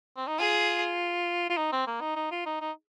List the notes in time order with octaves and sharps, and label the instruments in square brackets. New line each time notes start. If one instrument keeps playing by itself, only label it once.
[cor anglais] C4
D#4
[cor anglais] F4 [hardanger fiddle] G#4
[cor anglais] F4
D#4
C4
A#3
D#4
D#4
F4
D#4
D#4